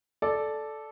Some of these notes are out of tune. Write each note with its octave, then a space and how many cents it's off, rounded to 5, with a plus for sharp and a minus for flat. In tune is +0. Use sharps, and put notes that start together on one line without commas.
A4 -10 D5 +0